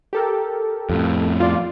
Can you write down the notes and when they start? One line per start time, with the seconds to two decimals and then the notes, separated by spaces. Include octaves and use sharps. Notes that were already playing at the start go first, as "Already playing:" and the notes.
0.13 G4 A4 A#4
0.90 F2 A2
1.40 F4 D5